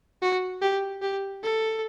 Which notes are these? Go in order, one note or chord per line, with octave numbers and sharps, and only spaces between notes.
F#4
G4
G4
A4